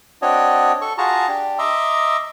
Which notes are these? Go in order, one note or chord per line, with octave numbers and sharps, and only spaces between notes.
C4 D4 F#4 C#5 D#5
A4 C#6
F4 F#4 G#4 A5 A#5 C#6
D4 G4
D#5 E5 A#5 C6 D6 E6